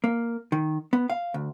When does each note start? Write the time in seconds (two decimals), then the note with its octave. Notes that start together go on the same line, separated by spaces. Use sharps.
0.04 A#3
0.52 D#3
0.93 B3
1.10 F5
1.34 D2